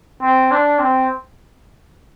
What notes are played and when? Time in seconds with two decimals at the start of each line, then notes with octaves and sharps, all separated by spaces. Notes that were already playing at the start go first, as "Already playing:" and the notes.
0.22 C4
0.51 D4
0.79 C4